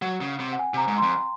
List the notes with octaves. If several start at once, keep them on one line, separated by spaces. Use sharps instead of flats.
F#3 F#5
C#3
C3
F#5
G#5
C3 A#5
G#2
F2 C6